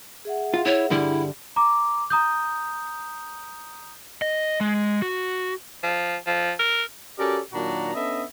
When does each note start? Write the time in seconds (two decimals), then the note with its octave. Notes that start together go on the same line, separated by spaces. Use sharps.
0.25 G#4 E5 F#5
0.54 F4
0.66 E4 C#5
0.90 G2 D3 G3 E4
1.56 A#5 D6
2.10 A#5 D#6 G6
4.22 D#5
4.61 G#3
5.02 F#4
5.83 F3
6.27 F3
6.59 A#4
7.18 C#4 F#4 G4 A4 A#4 D5
7.53 A#2 D#3 F#3 D4 F#4 A#5
7.94 B3 C#4 D4 A4 D#5 E5